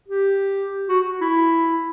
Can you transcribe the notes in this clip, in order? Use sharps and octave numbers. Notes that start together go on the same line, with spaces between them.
G4
F#4
E4